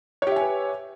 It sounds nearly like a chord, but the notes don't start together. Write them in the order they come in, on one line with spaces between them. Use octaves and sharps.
C#5 G4 E5 G#5 B4